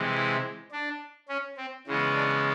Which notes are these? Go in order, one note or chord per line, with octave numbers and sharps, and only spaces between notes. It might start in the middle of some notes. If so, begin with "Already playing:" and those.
Already playing: C3 E3 G#3
E4
D4
C#4
C4
C#3 E3 G#3 B3
D4